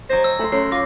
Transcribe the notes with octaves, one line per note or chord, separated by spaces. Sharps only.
F#3 G#4 C5 D#5 A#6
E6
A3 B5 C6
F#2 A3 C#5 C7
F4 D6 A#6